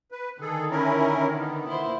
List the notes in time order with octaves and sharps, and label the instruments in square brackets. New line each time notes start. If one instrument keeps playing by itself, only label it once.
[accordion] B4
[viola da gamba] D3 D#3 [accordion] G#4 A4
[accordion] C#4 E4 A#4
B3
[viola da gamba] A#3 E4 C5